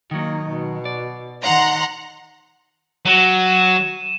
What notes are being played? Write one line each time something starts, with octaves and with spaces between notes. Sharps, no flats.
D#3 F#3 A#3 D#4
B2
D5
D#3 F#5 A#5 C6
F#3 D#7 E7